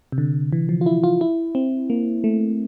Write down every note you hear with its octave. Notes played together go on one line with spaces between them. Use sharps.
C3
D3
E3
F3
F4
E4
F4
E4
C4
A#3
A3